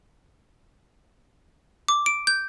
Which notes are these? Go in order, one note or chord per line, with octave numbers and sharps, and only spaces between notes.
D6
D7
G6